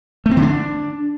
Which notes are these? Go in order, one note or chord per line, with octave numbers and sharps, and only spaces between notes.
A3
C4
D3
D4